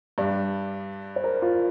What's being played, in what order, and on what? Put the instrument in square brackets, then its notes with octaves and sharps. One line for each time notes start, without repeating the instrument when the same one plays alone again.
[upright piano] G2 G3 D4 [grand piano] D5
[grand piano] C5
A#4
F4